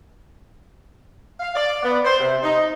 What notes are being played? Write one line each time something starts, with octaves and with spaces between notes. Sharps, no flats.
F5
D5
B3
C5
C3
D#4